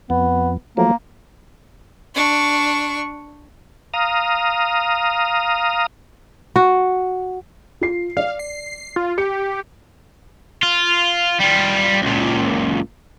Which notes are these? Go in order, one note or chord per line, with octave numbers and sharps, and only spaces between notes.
F2 B3
F3 F#3 A3 A#3
D4 C#6
F5 A#5 D#6
F#4
F4 C7
D5 F5
C7
F4
G4 C#7
F4
G3 F4
C#2 A#2